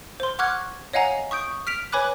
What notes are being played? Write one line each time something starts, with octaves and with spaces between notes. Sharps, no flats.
C5 C6
F#5 C#6 D6 F6 F#6 G#6
C#5 D#5 F5 F#5 G#5 A#5
C#6 D#6 G6 D7
F6 B6 D7 F7
B4 C#5 G#5 B5 D6 F#6